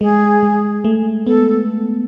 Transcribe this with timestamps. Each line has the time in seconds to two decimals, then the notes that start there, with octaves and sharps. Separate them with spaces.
0.01 G#3 G#4
0.43 G#3
0.84 A3
1.27 B3 A4